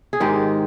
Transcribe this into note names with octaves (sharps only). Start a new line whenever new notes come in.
G#4
G#2 D#3 G#3 G4